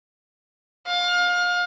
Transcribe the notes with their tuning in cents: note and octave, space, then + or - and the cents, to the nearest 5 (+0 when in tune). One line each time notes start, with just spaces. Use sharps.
F5 +30